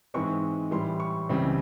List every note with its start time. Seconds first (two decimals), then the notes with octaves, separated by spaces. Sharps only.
0.14 G#2 E3 G#3 C4 C#6
0.71 A2 E3 G3 C6
1.00 C#6
1.29 C#2 C#3 E3 G3 C4